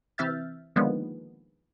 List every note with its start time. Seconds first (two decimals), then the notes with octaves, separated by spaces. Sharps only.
0.18 C3 E3 E5 F6 G6 A6
0.76 A#2 D3 D#3 F3 G#3 B3